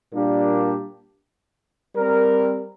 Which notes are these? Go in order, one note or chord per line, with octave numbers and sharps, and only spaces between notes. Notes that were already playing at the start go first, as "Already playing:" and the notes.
A#2 G3 A#3 D4 G4
G3 C4 A#4